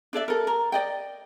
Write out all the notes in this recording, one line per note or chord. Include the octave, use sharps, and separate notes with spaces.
D4 A4 D5 E5
A4 A#4
A#4
D5 D#5 G5